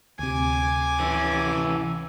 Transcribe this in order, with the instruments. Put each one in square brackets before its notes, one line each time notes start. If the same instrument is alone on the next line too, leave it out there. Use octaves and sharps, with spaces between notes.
[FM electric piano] D2 C3 [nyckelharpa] G#5 D6
[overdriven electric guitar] E3 C#4